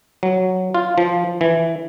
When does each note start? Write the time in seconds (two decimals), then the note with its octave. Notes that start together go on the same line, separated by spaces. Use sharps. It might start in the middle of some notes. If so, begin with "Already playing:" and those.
0.23 F#3
0.75 F4
0.98 F3
1.41 E3